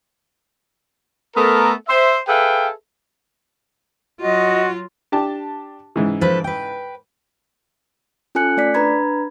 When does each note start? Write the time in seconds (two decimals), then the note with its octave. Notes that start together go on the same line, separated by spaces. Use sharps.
1.36 A3 B3 A4 A#4
1.88 C5 E5
2.28 G#4 A4 B4 E5 F5 G5
4.21 F#3 F4 F#4 D#5
5.12 D4 G4 A5
5.96 G#2 C#3 E3
6.21 F3 A4 B4
6.44 B4 G5
8.35 C#4 F4 A4 G#5 F#6 C#7
8.57 A3 D5 B6
8.74 D4 B4 A#5 B5 G#6